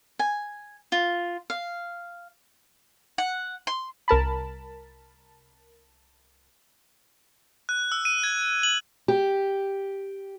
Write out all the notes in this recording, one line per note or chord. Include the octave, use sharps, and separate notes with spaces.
G#5
F4
F5
F#5
C6
C2 A#4 A5 B5
F#6
E6
D#7
G#6
F#7
G4